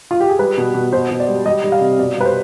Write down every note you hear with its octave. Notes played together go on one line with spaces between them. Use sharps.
F4
G4
G#4
G3 B4
B2
B2
B2 C5
B2
D5
G3
G3 D#5
G3
F5
C3
B2 D5
G3 B4
C5